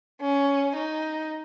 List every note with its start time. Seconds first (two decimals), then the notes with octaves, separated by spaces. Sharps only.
0.21 C#4
0.75 D#4